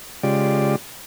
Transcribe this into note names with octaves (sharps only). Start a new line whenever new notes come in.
C#3 G#3 F4 G4 D5